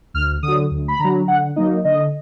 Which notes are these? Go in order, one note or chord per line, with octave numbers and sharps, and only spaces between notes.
D2 F6
D3 D#6
F#3
D2
B5
D3 F#3 A#5
D3 F#5
F#3 A#3 D#4 D#5
D3 D#5